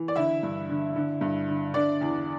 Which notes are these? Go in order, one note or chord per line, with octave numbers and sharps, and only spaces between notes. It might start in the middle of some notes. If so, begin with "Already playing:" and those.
Already playing: E3
D5
D3 E4 E5
G2
D3
D3
G2
D3
D3 D4 D5
E2